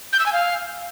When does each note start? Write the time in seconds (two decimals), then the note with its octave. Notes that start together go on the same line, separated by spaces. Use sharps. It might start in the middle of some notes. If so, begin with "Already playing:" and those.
0.13 G6
0.19 E6
0.26 G#5
0.33 F5